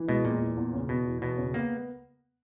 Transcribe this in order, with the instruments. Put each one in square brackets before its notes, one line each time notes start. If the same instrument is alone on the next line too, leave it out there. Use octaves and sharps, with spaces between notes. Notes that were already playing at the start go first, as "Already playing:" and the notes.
Already playing: [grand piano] E3
[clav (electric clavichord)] B2 [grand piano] G#3
[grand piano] E2 [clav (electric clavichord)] A#2
[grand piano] E3
E2
C#3
[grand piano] E2 [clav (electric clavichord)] B2
[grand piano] E3
[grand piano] E2 [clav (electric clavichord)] B2
[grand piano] C#3
[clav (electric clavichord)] A#3 [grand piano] B3